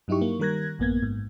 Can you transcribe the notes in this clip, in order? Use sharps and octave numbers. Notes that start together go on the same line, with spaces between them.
G2 F#3 D#4 E4 G4 C#6
A#3
D#3 G3 A#4 F#6 G#6 A#6
A1 F#2 A#3 B3 G#6
G#2